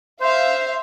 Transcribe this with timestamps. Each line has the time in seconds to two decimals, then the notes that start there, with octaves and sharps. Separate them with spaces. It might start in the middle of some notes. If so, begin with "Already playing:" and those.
0.21 C5 E5 F5